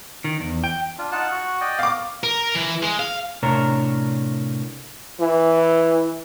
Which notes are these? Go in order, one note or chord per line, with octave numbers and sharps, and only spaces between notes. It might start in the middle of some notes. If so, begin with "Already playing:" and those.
D#3
E2
G5
D4 F4
D#4 F4 F#5 A5
F#4
D5 D#5 G5
F5 D6
A#4
E3
G#3
F5
A2 C3 D4 A#4 C#5
E3